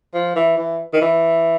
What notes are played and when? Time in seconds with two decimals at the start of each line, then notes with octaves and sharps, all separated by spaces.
0.14 F3
0.36 E3
0.57 E3
0.93 D#3
1.01 E3